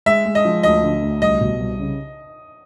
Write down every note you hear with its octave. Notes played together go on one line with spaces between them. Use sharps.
G#3 E5
G#3
D#5
F3
D2 D#5
D3
D2
C2 D#5
B2
C2
C#3